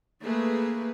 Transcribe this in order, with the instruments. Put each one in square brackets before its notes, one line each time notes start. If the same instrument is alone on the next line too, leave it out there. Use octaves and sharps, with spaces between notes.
[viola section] A3 G#4 B4 [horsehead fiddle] A#3